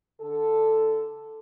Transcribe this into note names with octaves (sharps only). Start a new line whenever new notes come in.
D3 A4